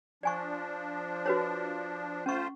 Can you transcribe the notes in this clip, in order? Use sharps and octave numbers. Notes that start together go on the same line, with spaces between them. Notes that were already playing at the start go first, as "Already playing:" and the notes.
F3 D4 D5 G#5 C#6
F#4 B4 C#5
A3 C#4 F4 C5 C#6